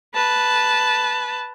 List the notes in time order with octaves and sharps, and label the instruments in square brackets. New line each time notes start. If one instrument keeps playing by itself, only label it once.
[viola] B4 A5